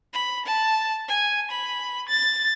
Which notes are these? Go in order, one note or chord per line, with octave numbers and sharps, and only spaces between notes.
B5
A5
G#5
B5
A6